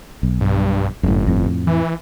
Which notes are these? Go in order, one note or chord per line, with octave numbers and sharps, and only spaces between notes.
B1
G2
G1 F#2 A2
F2 A2
E3